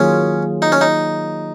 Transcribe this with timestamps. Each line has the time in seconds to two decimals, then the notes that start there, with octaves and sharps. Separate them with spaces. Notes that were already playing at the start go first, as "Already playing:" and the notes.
Already playing: D#3 F#3 A#3 C#4 F4 G#4
0.62 D#4
0.72 C#4
0.81 D#4